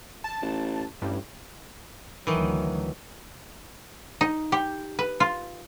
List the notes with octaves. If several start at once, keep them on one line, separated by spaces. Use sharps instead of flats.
A5
A1
A1 G2
D2 D#3 E3 F#3
D#4
G4
B4
F4